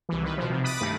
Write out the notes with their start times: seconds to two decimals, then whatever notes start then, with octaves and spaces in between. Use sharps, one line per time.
0.09 C2 E3
0.23 D#3 B4
0.38 B2 F3
0.50 C3
0.64 B5 D6 D#6 F#6 A6
0.81 G2 D#3 A3